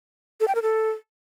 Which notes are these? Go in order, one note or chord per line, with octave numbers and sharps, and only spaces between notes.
A4
G5
A#4
A4